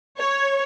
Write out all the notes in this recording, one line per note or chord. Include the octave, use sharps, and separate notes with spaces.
C#5